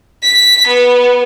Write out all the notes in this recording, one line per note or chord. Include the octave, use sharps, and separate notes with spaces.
B6
B3